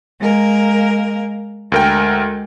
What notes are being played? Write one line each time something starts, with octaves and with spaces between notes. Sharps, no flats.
G#3 A#3 A#4
D2 G#3 A#4 G5